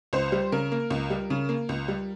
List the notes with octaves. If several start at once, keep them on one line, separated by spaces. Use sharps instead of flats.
C#2 C5
G3
C#3 A#4
A#3
C#2
G3
C#3
A#3
C#2
G3